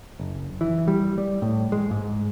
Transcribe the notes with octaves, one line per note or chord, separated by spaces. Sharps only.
F#1
E3
G3
G3
A2
G#3
G#2